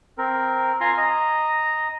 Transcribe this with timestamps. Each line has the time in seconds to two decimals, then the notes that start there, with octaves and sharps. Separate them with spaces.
0.18 C4 A#4
0.81 F4 G#5 A#5 C6
0.98 D#5 A#5